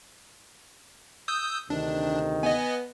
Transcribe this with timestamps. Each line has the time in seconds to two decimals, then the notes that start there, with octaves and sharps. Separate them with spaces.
1.28 D#6 E6 G6
1.70 D2 C3 D#3 D4
2.43 B3 D#5 G#5